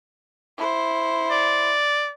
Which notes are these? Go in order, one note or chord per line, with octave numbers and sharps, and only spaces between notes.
E4 C5
D5